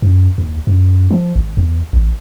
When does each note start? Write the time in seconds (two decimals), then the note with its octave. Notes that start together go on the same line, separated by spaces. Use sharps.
0.02 F#2
0.38 D#2
0.67 F#2
1.11 F3
1.36 G#1
1.57 E2
1.93 A1